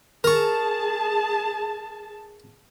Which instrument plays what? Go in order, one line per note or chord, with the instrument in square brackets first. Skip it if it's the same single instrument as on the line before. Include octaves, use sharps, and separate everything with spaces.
[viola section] G#4 A5 [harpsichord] A#4 C#6